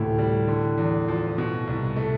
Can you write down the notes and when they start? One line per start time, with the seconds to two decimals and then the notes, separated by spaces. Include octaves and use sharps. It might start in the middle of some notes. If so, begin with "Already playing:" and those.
Already playing: D2 A2 C3
0.19 G3
0.48 D3
0.78 E2
1.08 F3
1.38 B2
1.67 C2
1.96 A3